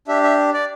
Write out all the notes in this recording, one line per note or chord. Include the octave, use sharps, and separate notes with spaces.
D4 G4 E5
E5
D5